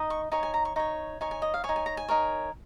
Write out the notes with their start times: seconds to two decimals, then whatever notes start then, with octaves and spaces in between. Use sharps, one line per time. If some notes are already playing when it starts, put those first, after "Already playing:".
Already playing: D#4 D#5
0.10 C#6
0.32 D#4 C#5 G#5
0.43 G#5
0.54 A#5
0.65 C#6
0.76 D#4 C#5 C#6
1.21 D#4 C#5 G#5
1.31 G#5
1.42 D#5
1.54 F5
1.64 C#5 G#5
1.69 D#4
1.76 G#5
1.86 A#5
1.97 G#5
2.08 D#4 A#4 C#5